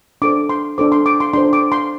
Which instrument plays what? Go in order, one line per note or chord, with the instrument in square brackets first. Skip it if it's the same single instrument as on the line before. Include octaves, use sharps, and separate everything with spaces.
[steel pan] D4 A4 C5 D6
C6
D4 A4 C5 D6
C6
D6
C6
D4 A4 C5 C6
D6
C6